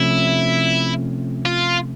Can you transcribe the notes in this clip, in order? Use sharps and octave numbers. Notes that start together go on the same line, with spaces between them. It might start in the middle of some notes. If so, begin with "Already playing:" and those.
Already playing: C3 F3 A3 C#4 E4
F4